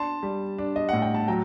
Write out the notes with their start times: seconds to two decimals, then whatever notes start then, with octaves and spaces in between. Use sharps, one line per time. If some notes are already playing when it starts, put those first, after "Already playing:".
Already playing: D4 A5 C6
0.23 G3
0.58 D4
0.76 D#5
0.89 A2 F#5
1.02 G5
1.14 A5
1.28 F#3 G5 A#5